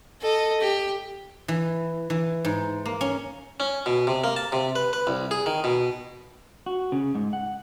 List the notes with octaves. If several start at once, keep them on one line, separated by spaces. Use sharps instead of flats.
A4 D#5
G4
E3
E3
G#2
A#3
C#4
C#4
B2
C3
A#3
A5
C3
B4
B4
C2
G#4
D#3
B2
F#4
C#3
G#2
F#5